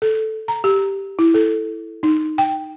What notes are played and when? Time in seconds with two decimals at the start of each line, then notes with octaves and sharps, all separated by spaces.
0.02 A4
0.48 A#5
0.64 G4
1.19 E4
1.34 A4
2.03 D#4
2.38 G5